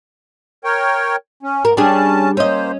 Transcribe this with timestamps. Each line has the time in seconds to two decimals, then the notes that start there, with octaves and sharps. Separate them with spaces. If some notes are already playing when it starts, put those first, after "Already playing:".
0.64 A#4 C#5 G5
1.43 C#4
1.65 G#2 A#4
1.77 G3 C#4 D4 G#4 A5
2.37 A#3 C#4 C5 D#5